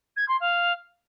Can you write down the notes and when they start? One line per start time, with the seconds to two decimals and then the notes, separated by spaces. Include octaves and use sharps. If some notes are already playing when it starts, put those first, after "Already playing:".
0.16 G#6
0.28 C6
0.40 F5